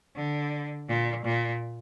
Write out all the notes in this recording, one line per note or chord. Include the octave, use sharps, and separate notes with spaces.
D3
A#2
A#2